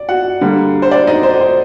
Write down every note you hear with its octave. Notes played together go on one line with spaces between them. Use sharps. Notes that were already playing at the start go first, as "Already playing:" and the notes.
Already playing: D5
F#4 F#5
D3 G3 A#3
C5
D5
D#4 D#5
C5
C5